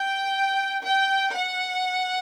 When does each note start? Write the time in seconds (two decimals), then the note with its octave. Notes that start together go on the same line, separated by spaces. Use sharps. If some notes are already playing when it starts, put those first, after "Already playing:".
Already playing: G5
0.84 G5
1.33 F#5